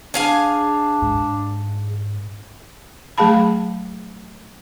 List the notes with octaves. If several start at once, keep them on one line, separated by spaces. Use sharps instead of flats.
D4 G#4 F5 G#5
G#2
F#3 A3 G#4 F5 A5 B5